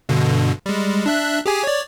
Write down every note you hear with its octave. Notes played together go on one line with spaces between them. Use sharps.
G2 B2 D3
G3 G#3
D4 E5 F#6
G4 G#4 G#5
C#5 D5